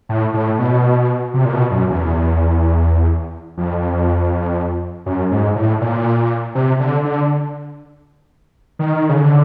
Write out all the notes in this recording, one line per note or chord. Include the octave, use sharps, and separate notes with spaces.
A2
A2
B2
C3
A#2
B2
F#2
E2
F2
F#2
G#2
A2
A#2
C3
D3
D3
D#3
C#3
D3